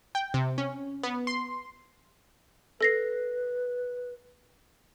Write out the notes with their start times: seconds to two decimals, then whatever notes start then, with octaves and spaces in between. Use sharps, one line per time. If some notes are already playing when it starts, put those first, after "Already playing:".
0.15 G5
0.34 C3
0.58 C#4
1.03 B3
1.27 C6
2.81 A4 B4 A#6 C7